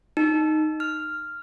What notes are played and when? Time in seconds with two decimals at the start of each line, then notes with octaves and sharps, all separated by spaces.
0.17 D#4
0.80 F6